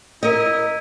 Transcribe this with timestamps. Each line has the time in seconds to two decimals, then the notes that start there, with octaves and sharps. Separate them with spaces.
0.23 E4 A#4 D#5